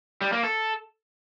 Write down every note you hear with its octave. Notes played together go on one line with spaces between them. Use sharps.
G3
A#3
A4